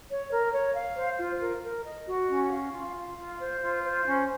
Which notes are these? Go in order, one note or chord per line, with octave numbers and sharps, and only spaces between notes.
C#5
A#4
C#5
F5
C5
F4
A#4
A#4
D#5
F#4
C#4
F5
F4
F5
F4
C5
F4
C5
C#4